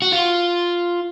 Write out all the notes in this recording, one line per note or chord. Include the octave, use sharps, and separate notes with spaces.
F#4
F4